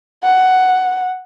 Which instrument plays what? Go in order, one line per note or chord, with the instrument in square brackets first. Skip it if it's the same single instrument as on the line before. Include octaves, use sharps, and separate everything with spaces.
[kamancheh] F#5